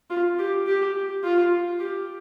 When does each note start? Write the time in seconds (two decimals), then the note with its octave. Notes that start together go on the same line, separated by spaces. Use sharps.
0.10 F4
0.38 G4
0.67 G4
1.23 F4
1.79 G4